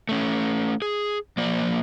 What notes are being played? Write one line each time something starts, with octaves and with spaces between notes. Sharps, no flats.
A3 C#4
G#4
F3 A#3 D5